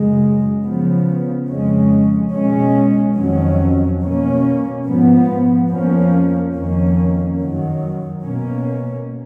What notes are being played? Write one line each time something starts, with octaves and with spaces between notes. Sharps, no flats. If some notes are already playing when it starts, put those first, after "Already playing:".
Already playing: F#2 C#3 G#3
C#3 F3 B3
F2 C#3 G#3 C#4
B2 G#3 C#4
F2 D#3 F#3 C#4
B2 A#3 C#4
G#2 F3 B3
F2 F3 A#3 C#4
F2 D#3 A#3 C#4
F#2 D#3 F#3
B2 A#3 C#4